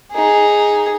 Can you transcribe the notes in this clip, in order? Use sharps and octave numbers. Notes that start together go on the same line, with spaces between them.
D#4 G#4